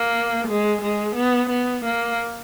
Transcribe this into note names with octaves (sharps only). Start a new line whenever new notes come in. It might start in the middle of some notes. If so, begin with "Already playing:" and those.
Already playing: A#3
G#3
G#3
B3
B3
A#3